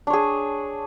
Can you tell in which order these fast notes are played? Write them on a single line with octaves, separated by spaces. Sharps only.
D4 C#5 G#4